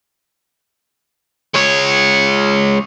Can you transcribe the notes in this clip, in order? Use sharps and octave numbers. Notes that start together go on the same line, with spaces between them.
G#3 C#5